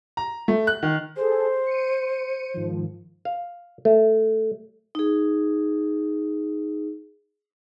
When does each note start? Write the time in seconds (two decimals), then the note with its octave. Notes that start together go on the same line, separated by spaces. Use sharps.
0.17 A#5
0.48 A3
0.67 F#6
0.83 D#3
1.16 G#4 A4 C5
1.66 C#7 D#7
2.54 G#2 D#3 F3
3.25 F5
3.85 A3
4.95 D#4 G#4